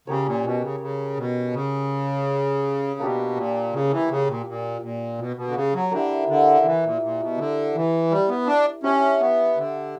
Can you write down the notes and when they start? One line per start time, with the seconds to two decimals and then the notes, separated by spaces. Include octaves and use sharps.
0.07 C#3 C#4 G4 A#4 C#5
0.26 A#2
0.43 B2
0.62 C#3
0.80 C#3
1.16 B2
1.53 C#3
2.99 B2 A#3 D4 G4
3.36 A#2
3.73 C#3
3.90 E3
4.09 C#3
4.27 A#2
4.46 A#2
4.81 A#2
5.18 B2
5.36 B2
5.48 D3
5.55 C#3
5.74 F#3
5.91 D3 E4 G4 A#4
6.28 D3
6.65 E3
6.84 A#2
7.02 A#2
7.20 B2
7.38 D3
7.75 E3
8.10 G3
8.29 B3
8.47 D4
8.83 C#4 D4 G4 C#5 E5
9.20 B3
9.57 D3